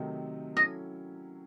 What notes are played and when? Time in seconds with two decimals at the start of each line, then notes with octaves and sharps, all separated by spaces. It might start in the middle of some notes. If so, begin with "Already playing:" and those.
Already playing: C3 D#3 F#3 A3 D#4
0.56 F#3 C#4 E4 A4 D#5